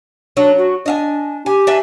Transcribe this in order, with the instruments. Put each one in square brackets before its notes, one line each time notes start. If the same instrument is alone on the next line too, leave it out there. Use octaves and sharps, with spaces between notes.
[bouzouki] F#3 [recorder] D4
[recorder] F#4
[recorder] D4 [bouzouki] D#5 F5 G#5
[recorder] G4 [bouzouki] G#5
[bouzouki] D4 E5 G#5